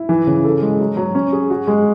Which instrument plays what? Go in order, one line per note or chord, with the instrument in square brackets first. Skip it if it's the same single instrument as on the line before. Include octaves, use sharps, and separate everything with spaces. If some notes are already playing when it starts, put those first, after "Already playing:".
Already playing: [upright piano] E4
E3
C#3
A4
G#3
F#3
F#3
C#4
G#4
F#4
G#3